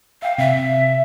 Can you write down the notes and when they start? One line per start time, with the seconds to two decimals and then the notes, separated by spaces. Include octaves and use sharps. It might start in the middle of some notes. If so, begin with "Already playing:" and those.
0.22 E5 F5 G5
0.38 C3 E5